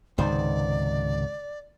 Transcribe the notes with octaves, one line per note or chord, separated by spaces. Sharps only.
C#2 G#2 C3 D#3 C5 D5